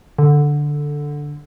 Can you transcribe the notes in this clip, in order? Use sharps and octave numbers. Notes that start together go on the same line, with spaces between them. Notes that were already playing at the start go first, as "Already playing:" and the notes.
D3